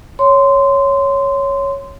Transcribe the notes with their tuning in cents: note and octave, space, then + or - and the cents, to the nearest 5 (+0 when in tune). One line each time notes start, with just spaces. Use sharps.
C#5 +0 C6 -15